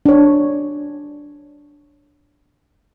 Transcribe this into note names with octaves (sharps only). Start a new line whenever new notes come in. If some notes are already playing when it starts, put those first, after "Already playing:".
D4 C#5